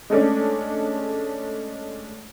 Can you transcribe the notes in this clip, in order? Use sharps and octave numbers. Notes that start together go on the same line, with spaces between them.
G#3 A3 C#4 D4